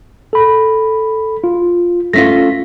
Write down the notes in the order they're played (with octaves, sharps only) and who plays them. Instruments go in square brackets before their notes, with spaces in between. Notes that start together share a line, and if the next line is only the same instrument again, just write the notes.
[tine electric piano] A4 B5
F4
[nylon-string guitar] A3 C#4 F4 [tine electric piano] A#6 B6